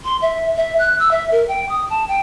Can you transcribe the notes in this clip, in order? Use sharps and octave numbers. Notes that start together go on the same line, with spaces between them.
C6
E5
E5
F#6
E6
E5
A#4
G5
D#6
A5
G5